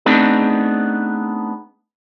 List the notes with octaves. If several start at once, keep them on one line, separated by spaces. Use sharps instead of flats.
A3 B3 C4 D4 D#4 G#4